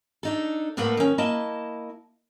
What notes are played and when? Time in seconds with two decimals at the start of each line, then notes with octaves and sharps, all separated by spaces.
0.23 D4 D#4 A4
0.77 A2 A3 A#3 A4 B4 F#5
0.97 D#3 C#4
1.18 A#3 E4 D#5 A5